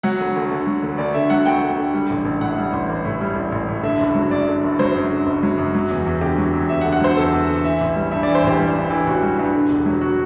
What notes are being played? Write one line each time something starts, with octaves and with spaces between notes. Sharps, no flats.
F#3 F#5
D2
D2
D3
F#3
D2
D2 D5
D3 E5
F#3 F#5
D2 G5
D2
D3
G3
A1
A1
A2 F#5
G3
A1
A1
A2
G3
A1
A1
A2
D3 E5
F#1
F#3
F#2 D5
D3
F#1
F#3 C5
F#2
D3
F#1
F#3
F#2
F#3
E2
E2
D3 G4
F#3
E2
E2 E5
F#5
D3
F#5
F#3 C5
E2 A4
E2
D3
E3 E5
A1
G3
G2 E5
D5
E3
C5
A1 G4
G3
G2
E3
A1 F#4
G3
G2
D3
E1
F#3
F#4